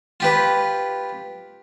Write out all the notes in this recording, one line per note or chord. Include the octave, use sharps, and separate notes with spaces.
F4 G4 B4